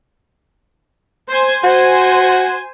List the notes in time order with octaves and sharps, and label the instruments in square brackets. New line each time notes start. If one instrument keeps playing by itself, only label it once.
[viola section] C5 G#5
[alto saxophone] F#4 [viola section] C5 G#5